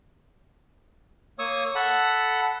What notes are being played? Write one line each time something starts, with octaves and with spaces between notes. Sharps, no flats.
A#3 C#5 C#6 D#6 E6
A4 F#5 A5 B5